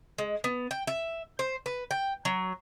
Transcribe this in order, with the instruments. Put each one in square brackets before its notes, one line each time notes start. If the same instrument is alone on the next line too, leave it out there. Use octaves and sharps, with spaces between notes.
[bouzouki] G#3
B3
G5
E5
C5
B4
G5
F#3